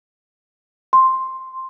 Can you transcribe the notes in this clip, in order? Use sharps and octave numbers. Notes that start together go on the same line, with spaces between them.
C6